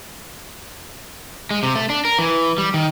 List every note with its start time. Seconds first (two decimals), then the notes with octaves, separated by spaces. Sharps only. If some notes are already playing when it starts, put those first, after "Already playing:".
1.51 G#3
1.63 C3
1.75 A3
1.90 D4
2.05 A#4
2.18 E3
2.58 G3
2.74 D#3